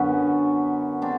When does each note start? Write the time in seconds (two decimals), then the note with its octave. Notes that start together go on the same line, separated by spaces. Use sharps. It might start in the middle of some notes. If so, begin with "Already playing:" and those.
Already playing: F#2 D3 F#3 B3 C#4
1.01 F#3 C4 D4